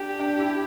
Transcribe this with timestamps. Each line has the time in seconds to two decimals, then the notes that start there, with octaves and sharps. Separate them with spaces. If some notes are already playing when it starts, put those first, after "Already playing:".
Already playing: D4 G4
0.19 D4
0.39 E4